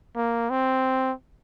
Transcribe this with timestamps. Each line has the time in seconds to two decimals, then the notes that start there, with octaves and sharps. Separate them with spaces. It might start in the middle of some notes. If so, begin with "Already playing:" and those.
0.16 A#3
0.50 C4